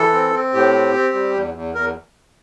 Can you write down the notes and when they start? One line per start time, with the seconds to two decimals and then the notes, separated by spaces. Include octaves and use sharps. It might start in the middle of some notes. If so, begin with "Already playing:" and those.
Already playing: E3 A4
0.13 C4
0.33 C4
0.53 A2 G4
0.73 C4
0.94 C4
1.14 G3
1.34 E2
1.54 E2
1.75 E2 A#4